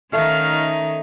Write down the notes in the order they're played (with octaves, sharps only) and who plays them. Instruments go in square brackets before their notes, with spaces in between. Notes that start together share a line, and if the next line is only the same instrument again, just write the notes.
[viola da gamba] D#3 C#4 D#4 [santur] A3 [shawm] F5